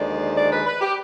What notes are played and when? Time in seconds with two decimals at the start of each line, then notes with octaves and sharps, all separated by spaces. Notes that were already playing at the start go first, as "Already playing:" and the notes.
Already playing: D#2 D3 F3 G#3 D5
0.36 D5
0.51 B4
0.66 B4
0.81 G4